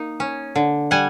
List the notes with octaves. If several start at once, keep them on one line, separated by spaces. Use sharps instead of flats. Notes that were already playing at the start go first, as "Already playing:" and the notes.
Already playing: A#3 D#4
C#4
D3
G3 F#5 G#5